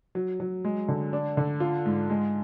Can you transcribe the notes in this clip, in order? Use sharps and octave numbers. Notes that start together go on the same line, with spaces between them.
F#3
F#3
G#3
D3
D4
D3
F4
G#2
G#3